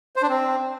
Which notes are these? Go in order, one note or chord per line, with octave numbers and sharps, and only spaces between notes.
C5
D4
C4